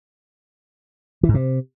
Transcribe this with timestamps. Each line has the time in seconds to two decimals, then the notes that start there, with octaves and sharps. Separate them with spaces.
1.23 E3
1.29 G#2
1.34 C3